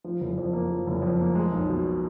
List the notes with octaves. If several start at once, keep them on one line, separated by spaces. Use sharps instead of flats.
F3
F#1
F2
A#3
F3
F#1
F2
A#3
G#3
B1
B2